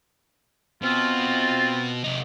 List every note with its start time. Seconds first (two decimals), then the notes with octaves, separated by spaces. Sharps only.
0.82 B2 C4 F4
2.04 C3 D#4